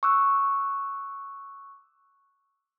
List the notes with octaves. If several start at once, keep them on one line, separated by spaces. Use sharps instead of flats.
C#6 D6 E6 F#6